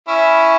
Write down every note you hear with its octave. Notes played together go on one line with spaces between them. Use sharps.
C#4 E4